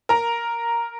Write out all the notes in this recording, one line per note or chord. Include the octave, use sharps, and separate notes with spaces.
A#4 A#5